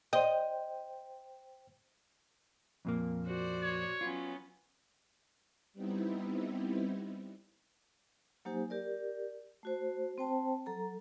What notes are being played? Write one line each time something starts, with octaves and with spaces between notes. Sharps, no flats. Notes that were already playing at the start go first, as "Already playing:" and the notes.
C5 D#5 G5
F2 A#2 A#3
F#4 C5 D5
C#5
F#3 B3 C#4 F4
G3 B3 C4 D#4 E4
F#3 A#3 D#4 G4 C5 G#5
G4 A#4 D5
A3 F#4 C5
C4 C5 G5 A5
F#3 A4 A#5